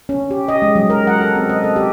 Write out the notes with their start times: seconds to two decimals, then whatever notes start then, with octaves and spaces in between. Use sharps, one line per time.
0.09 C#4
0.31 G4
0.48 D#5
0.62 G#3
0.75 F#3
0.90 A#4
1.07 F#5
1.21 A4
1.35 C4
1.49 D#5
1.64 A4
1.76 G4